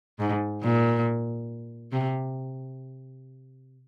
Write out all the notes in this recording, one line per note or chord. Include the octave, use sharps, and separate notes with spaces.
G#2
A#2
C3